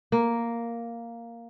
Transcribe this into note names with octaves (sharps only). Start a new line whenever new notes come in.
A#3